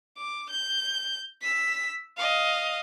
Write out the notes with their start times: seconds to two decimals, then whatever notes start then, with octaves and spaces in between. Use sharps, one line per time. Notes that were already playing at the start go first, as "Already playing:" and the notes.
0.18 D6
0.50 G6
1.41 E6 B6
2.17 D#5 F5